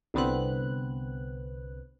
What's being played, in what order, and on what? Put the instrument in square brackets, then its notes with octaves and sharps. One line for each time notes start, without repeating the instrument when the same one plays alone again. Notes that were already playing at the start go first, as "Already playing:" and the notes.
[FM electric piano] C2 D3 B3 C4 B4 F#6